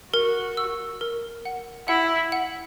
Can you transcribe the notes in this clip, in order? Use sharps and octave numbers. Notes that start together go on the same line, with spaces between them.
F#4 A#4
E6
A#4
F#5
E4 F#5
F#5